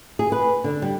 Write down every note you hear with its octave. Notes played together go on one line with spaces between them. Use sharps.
G#4
B4
D3
G3